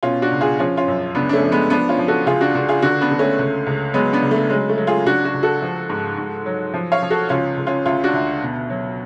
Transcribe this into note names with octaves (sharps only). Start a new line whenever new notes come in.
B2 C#4 F4
D4 F#4
C#2
F4 G#4
F3 C#4 F4
C#4 F4
F#2
C#2 B3 D4
D4
A3 C#4
F3
G#3 B3
F3 B3 D4
C#4 F4
F3
F#4 A4
C#2 F4 G#4
D4 F#4
C#2 D4 F#4
F4 G#4
D3 D4 F#4
B3 D4
D3
A3 C#4
C#2
C#2
F#3 G#3 B3
B3 D4
C#3
A3
F#3 G#3
A3
F#3
F4 G#4
C#2 D4 F#4
D4 F#4
C#2
F#4 A4
F3
G#2
G#2
F#3
F3
C#5 F5
F3
F#4 A4
C#2 C#4 F4
C#2
C#4 F4
D2 C#4 F4
D4 F#4
D2
B2
F#3